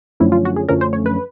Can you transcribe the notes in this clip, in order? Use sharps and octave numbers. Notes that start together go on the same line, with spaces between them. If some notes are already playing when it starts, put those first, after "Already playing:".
F#2 D3 F3 A3 C#4 E4
F4
F#4
G#4
F#2 D3 F3 A3 C#4 A#4
C5
C#5
B4